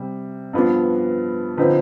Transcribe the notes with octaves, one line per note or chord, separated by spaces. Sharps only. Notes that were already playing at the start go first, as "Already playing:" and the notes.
Already playing: C3 G3
G2 F3 B3 D4
D3 F3 C4 D#4 B4